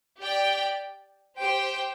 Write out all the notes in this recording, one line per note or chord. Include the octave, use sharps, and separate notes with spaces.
G4 D5 G5
G4 C5 G5